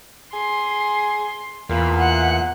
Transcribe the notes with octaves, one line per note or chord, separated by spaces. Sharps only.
G#4 C6
E2 A#2 F5 B5
F#5 F#6 C#7